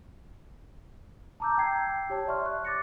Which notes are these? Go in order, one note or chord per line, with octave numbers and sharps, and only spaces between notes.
A5 A#5 D6 E6 G6
G5 E6 G6 G#6 C7
G4 C#5 A5
D5 E5 C6 C#6 F6
F#6
D6 A6 A#6 C#7